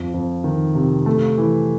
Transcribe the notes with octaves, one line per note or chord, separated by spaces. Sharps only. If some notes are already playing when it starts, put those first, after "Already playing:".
Already playing: F2
F2
D#3
C3
A3
E3